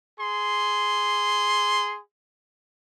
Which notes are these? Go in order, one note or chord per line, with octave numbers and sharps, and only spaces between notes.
G#4 C6